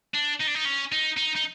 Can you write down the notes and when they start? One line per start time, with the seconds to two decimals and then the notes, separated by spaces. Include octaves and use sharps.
0.15 D4
0.41 D#4
0.48 D4
0.55 D#4
0.66 C#4
0.92 D#4
1.17 D#4
1.36 D#4